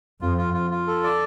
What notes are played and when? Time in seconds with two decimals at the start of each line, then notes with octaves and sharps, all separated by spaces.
0.21 F2 F4
0.38 F4
0.54 F4
0.70 F4
0.87 A4
1.04 D5